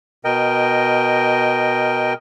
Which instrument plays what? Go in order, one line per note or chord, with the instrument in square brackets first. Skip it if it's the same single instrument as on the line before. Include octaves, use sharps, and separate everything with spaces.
[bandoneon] B2 A#4 D#5 G5